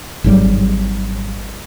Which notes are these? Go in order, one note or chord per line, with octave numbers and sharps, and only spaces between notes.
G#1 G#2 F#3 G3